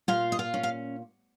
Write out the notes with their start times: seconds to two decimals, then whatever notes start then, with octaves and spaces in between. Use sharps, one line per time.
0.08 A#2 F4 F5
0.32 D#5
0.39 F4 F5
0.54 C#4
0.63 F5